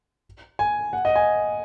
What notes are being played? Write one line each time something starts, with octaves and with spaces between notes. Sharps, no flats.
G#5
F#5
D#5
G#5